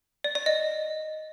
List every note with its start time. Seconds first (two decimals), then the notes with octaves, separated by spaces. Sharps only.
0.24 D5
0.35 D5
0.46 D#5